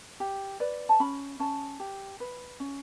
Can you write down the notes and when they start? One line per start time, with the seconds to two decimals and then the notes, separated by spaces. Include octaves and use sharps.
0.20 G4
0.60 B4 D5
0.89 A5
1.00 C#4 B5
1.40 C#4 A5
1.80 G4
2.20 B4
2.60 C#4